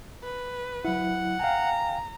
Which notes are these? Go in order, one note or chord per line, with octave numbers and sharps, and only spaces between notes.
B4
F#3 E4 F#5
F5 G5 G#5 A#5